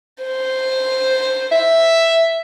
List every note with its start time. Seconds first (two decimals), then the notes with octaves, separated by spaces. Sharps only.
0.24 C5
1.52 E5